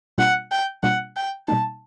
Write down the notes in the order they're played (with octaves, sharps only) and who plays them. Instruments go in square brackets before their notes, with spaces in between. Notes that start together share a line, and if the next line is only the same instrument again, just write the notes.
[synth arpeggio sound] B2 G3 A#3 D4 F4 [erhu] F#5
[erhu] G5
[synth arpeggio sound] B2 G3 A#3 D4 F4 [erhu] F#5
[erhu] G5
[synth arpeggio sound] B2 G3 A#3 D#4 [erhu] A5